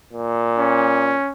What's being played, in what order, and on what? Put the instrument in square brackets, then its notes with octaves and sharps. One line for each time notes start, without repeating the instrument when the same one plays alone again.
[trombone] A#2
[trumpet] C#4